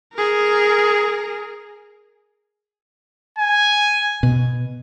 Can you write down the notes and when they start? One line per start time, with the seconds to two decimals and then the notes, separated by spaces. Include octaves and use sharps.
0.14 G#4 A#4
3.38 G#5
4.23 B2